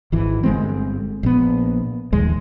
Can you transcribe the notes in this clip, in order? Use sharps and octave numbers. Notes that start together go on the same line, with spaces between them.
G#1 E3
G1 G#3 C4
A#1 B3
A#1 D#2 G#3